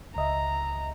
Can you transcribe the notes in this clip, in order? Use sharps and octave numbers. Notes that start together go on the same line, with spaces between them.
C#2 D#5 E5 A#5